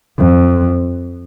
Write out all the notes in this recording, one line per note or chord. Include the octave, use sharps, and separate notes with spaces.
F2